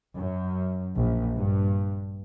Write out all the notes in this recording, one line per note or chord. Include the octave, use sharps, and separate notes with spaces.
F#2
A#1
G2